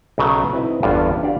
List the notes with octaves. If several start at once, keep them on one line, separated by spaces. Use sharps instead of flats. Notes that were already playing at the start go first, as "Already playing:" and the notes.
B1 C#3 F#3 A3
C4 D#4 E4 B4 D#5
G1 E2 G2 D3 F4 G#5
D4 F#4 G4 D5 F5